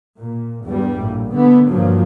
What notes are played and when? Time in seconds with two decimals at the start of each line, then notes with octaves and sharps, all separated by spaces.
0.18 A#2
0.63 E2 G2 G3
0.97 A#1 A2
1.32 D3 A3 B3
1.66 G2 A#2 F3 F#3